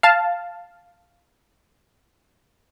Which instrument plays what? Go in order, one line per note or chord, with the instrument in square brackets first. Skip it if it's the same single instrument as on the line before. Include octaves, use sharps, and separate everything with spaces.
[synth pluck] F5 A5